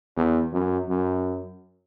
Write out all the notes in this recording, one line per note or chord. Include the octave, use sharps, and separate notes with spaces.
E2
F#2
F#2